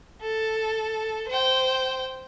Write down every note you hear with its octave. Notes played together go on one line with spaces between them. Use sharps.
A4
C5 G5